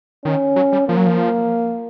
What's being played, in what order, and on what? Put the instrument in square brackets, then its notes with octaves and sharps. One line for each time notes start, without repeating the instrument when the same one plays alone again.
[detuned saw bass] D#3 [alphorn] C#4
[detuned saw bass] F#3
G3
[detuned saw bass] F3 [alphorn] A#3
[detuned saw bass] F#3
F3